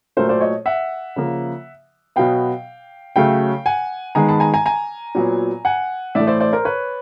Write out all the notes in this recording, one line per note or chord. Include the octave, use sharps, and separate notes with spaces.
A#2 F#3 A3 A#4 C5
C5 D5
C#5 D#5
E5 F#5
C#3 F3 A#3
B2 F#3 B3 F5 G5
C#3 F#3 A3 F5 G5
F#5 G#5
D#3 G#3 B3 G#5 A#5
A5 B5
G#5 A#5
G#5 A#5
G#5 A#5
A#2 F#3 B3
F#5 G#5
A2 E3 A3 D5 E5
C5 D5
C5 D5
A#4 C5
B4 C#5